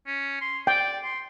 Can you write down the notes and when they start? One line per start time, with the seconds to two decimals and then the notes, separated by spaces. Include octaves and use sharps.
0.07 C#4
0.41 C6
0.67 D5 G5
1.04 C6